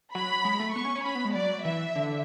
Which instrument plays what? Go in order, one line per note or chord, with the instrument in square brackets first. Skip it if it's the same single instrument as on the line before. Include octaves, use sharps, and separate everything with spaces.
[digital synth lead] F#3 [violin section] B5
[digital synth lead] G#3
A3
[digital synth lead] B3 [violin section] C#6
[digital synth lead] C#4
C#4
[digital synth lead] C#4 [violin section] B5
[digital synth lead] B3
G#3
[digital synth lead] F#3 [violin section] D5
[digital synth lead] E3 [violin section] E5
[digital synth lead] D3